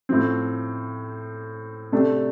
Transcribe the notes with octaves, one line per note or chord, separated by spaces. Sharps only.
A2 F3 C4
C3 A3 D4 G4